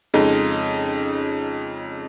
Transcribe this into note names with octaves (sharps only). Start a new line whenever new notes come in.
F2 C#3 G#3 D#4